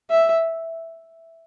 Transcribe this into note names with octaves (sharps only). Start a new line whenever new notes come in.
E5